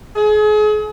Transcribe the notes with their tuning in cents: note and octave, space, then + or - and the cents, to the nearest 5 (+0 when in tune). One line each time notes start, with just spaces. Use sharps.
G#4 +35